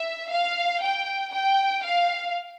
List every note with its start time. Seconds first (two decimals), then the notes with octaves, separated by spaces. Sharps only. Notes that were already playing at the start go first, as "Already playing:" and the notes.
Already playing: E5
0.30 F5
0.81 G5
1.32 G5
1.83 F5